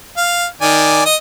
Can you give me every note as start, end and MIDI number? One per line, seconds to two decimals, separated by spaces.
0.17 0.46 77
0.61 1.02 51
0.61 1.02 74
0.61 1.02 80
1.06 1.16 75
1.06 1.16 87